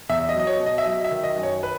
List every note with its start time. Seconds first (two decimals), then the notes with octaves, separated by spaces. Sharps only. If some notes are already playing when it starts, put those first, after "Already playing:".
0.09 E2 E5
0.29 D#5
0.34 F#3
0.39 D#5
0.47 C#5
0.60 B2
0.66 D#5
0.78 E5
0.85 F#3 D#5
1.05 E5
1.11 D#3
1.24 D#5
1.36 F#2
1.43 C#5
1.63 B4